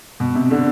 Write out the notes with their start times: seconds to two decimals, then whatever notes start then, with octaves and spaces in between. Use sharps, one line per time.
0.20 B2
0.35 C3
0.51 D3